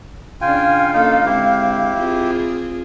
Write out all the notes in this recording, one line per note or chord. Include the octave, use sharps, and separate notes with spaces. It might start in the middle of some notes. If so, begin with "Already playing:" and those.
C#3 D4 F4 F5 G5 G#5
A#3 C#4 D#4 F4 A4
D3 G#3 C4 E4 G4
C4 F4 G#4